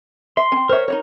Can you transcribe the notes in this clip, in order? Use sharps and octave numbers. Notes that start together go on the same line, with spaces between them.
E5 C6
C4 C#4
A#4 C5 C#5 E5
D#4 F#4 A#4 C#5